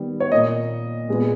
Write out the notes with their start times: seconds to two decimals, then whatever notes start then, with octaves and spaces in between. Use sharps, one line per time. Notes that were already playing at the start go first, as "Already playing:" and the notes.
Already playing: D#3 G3 B3
0.20 C#5
0.32 A#2 A#3 D#5
1.09 A#2 G#3 B3